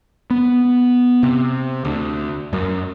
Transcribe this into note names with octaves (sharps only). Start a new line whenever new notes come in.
B3
C3
D2
F#2